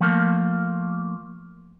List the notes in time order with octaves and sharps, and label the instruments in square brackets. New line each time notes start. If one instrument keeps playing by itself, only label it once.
[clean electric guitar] F3 A3 A#3